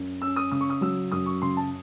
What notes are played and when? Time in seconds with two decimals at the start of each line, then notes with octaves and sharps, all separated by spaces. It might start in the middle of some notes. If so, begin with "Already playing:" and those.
Already playing: F#2
0.22 C#4 E6
0.36 D#6
0.51 C#3 D#6
0.61 C#6
0.70 D#6
0.81 F#3 E6
1.12 F#2 D#6
1.26 C#6
1.42 C#3 C6
1.57 A5